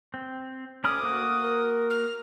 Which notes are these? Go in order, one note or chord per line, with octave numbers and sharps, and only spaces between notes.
C4
D2 C#4 B5 D6 D#6 F6
A#3 F#4
A#4
F6